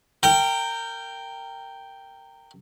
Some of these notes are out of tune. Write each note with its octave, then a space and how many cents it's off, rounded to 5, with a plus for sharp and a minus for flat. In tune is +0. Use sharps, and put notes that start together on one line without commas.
A#4 -20 G5 +0